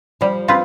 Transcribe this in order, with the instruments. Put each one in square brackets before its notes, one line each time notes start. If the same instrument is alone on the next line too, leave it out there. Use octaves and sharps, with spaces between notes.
[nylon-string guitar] F3 [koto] G3
[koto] C4 F4 B4